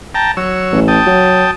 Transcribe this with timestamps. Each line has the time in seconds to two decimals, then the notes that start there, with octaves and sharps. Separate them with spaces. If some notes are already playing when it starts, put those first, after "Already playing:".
0.15 G5 A5 A#5
0.37 F#3 C#5 E6
0.72 A1
0.88 G5 A5 D#6
1.07 F#3